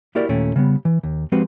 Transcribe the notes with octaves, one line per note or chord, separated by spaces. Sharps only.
A#3 E4 F#4 G4 A#4 D5
D#2 A#2 A3 C#4 G5
C#3 G3 B3
E3
D#2
F3 G#3 C4 F#4 G4 B4